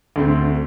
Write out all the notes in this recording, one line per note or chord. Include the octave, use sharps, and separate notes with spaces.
D2 D3 A3 C4